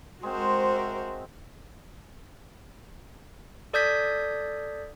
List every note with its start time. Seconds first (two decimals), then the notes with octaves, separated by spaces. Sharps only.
0.23 G#3 C4 F#4 A#4 C5
0.74 E5
3.73 A4 D5 D#6 G6 G#6 B6